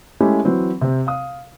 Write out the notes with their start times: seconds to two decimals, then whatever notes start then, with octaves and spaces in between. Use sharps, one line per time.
0.20 G#3 A3 C#4 E4 G4
0.45 E3 F#3 C4
0.81 C3 C4
1.07 F5 D#6